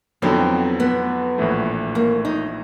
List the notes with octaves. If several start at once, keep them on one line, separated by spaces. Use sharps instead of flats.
F2 D3 F#3 B3 C4 D#4
B3
A#1 A2 E3 A3
A#3
D#4